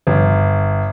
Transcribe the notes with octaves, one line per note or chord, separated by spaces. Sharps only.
G1